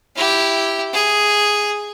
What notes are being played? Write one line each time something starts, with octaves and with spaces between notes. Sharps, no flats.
E4 G4
G#4